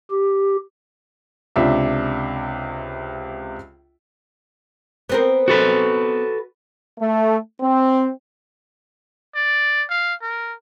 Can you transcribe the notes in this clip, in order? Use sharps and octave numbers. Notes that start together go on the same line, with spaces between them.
G4
C#2 C3 D4 E5
B3 C4 A#4
F#4 A4 B4
A3
C4
D5
F5
A#4